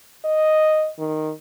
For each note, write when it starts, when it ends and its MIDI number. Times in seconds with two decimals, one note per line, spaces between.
0.24 0.89 75
0.99 1.32 51